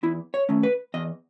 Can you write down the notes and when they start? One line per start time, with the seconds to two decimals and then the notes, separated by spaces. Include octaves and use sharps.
0.03 E2 E4
0.34 C#5
0.49 D#3 A3 C#4
0.63 B4
0.94 E2 D#5